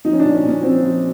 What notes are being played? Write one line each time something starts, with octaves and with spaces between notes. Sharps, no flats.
F3 D#4
C#4
A#2 D4
C#4
A#2
C#4
F3 C4
F3